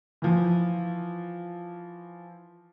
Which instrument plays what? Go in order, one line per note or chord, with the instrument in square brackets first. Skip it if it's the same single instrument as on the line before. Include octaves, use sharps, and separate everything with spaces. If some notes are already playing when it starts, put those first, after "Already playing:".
[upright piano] E3 F3